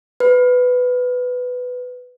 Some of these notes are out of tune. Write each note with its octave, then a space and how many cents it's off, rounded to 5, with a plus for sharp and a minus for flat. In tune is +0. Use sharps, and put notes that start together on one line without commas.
B4 +10